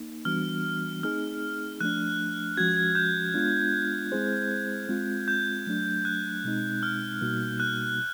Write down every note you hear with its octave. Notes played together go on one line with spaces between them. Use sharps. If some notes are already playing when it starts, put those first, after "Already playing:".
Already playing: A#3 D#4
E3 G3 B3 D4 F#4 F6
A3 C4 D#4 G#4 F6
F3 A3 D4 F#6
F3 G#3 C#4 F#4 G#6
G#6
G6
G#3 B3 D4 F4
G#3 C4 E4 G#4 C5
G#3 C4 F4
G6
F#3 A3 D4
F#6
B2 G#3 C4 D#4
F6
B2 G3 A#3 D#4 F#4
F#6